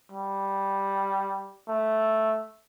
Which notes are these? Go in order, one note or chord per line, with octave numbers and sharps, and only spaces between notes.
G3
A3